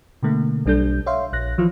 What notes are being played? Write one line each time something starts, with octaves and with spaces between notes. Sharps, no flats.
B2 D3 A3 A#3
B1 G3 D4 A4 G6
C#5 E5 F5 C6
A#1 F#6 A#6
E3 F3 F4